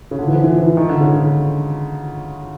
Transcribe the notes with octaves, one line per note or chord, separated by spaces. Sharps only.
C#3
D3
E3
F3
E3
F3
E3
D#3
D3
C#3
D3